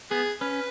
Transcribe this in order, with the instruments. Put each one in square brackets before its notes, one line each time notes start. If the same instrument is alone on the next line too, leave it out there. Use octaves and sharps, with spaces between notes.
[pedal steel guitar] B3 [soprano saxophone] G#4
[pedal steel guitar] C#4 [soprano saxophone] B4